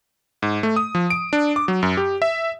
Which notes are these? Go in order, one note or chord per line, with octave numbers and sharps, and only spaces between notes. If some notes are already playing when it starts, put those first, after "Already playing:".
G#2
A3
D#6
F3
D7
D4
D6
F#3
F#2
G4
E5